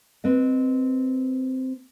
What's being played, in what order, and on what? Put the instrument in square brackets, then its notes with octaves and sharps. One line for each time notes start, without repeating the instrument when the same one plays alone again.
[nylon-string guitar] C4 B4 D#5